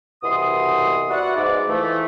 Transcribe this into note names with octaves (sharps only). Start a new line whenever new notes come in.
C2 B2 E3 B3 C6 D#6
F#4 B4 D5 E5 F#5
G#2 D5
E3 F3 A3